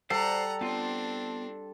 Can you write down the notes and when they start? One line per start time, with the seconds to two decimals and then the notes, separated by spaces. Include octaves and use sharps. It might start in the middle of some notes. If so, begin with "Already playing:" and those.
0.10 G3 A4 C5 D5 F5 F#5 A#5
0.61 B3 C4 D4 F4